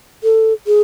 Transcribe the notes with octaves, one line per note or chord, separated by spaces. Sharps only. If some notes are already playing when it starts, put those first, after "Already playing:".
A4
G#4